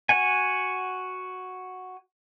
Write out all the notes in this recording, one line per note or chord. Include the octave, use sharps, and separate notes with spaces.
F#4 F#5 G#5